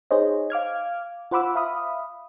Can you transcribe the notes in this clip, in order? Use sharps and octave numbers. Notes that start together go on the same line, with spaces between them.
D#4 G#4 C5 C#5 D#5
F5 D6 F6 G#6
F4 C5 F#5 B5 D6 E6
E5 F5 B5 D#6